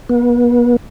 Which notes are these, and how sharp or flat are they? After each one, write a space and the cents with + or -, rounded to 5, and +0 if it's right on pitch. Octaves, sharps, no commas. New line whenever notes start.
B3 -40